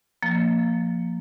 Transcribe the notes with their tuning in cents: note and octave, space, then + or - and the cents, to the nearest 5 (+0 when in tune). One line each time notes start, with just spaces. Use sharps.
F3 +0 A#3 -10